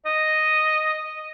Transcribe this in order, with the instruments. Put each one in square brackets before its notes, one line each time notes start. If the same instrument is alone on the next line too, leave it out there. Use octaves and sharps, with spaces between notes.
[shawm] D#5